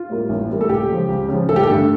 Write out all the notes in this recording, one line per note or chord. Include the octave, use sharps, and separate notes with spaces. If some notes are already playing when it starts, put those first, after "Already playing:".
Already playing: F4
A2 G3 A#3
A1
A2 G3 A#3
A4
C#2 G4
C#3 F3
C#2
C#3 F3
A1 A4
G4
A4
G2 D3 A3